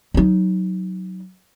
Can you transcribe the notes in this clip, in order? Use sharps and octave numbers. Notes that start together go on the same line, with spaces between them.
F#3 D#4